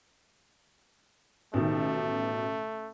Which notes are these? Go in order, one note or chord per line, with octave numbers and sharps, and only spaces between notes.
A1 B2 D#3 A3